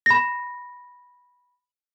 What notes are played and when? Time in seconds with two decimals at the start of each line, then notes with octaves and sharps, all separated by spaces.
0.06 B5 A#6